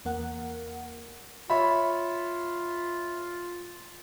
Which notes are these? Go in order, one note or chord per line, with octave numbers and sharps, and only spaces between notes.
E2 A#3 A#4 F#5
F4 C#5 E5 B5